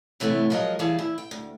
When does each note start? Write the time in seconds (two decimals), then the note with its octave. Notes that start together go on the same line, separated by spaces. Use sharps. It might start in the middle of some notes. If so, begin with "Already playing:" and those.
0.20 A2 C3 E3 A3 B3
0.50 F3 F#3 G#3 A#4 D#5
0.79 E3 G3 G#4 F5 A5
0.99 E2 E4
1.18 G5
1.31 D2